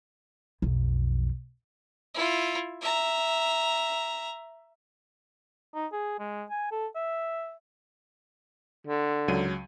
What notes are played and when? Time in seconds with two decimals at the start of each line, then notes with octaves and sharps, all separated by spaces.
0.62 B1 F2
2.14 E4 F4
2.81 E5 A#5
5.75 D#4
5.92 G#4
6.19 G#3
6.50 G#5
6.72 A4
6.95 E5
8.87 D3
9.28 C#2 F#3 D#7